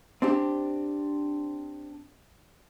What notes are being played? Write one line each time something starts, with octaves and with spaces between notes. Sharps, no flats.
C4 D4 G4